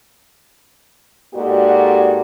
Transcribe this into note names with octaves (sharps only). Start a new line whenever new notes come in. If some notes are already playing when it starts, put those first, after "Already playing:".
G#2 A#3 F#4 G4 A4 D5